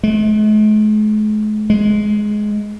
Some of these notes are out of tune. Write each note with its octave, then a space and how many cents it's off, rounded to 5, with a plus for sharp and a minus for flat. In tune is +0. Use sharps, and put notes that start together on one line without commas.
G#3 +45
G#3 +15